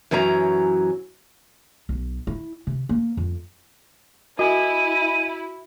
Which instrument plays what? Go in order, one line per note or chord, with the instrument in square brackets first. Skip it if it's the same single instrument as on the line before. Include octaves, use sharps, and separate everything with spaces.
[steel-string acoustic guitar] F#2 E3 F#3 C#4 A#5
[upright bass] B1
E4
C3
A#3
F2
[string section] E4 [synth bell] F#4 [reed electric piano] D#5 G#5 [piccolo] D#7